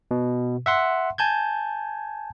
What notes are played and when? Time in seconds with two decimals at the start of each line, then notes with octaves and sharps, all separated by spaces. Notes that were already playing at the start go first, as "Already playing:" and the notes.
0.11 B2
0.66 E5 F#5 C6
1.18 G#5 A5 G6 G#6